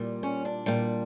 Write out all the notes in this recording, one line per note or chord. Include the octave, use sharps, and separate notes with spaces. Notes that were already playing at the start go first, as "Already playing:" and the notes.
Already playing: A#2 G3
C#4
D4
A#2 G3